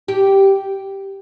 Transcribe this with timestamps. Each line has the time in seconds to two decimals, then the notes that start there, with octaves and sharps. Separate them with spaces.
0.08 G4